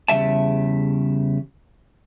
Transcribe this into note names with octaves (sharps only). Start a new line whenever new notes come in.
E2 C#3 G3 E5 A5